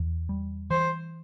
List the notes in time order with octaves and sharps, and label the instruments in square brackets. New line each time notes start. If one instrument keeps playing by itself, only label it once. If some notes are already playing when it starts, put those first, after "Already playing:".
Already playing: [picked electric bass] E2
G3
[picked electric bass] E3 [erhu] C5